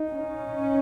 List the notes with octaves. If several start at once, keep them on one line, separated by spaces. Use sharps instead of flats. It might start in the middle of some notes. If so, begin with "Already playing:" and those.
Already playing: D#4
C#4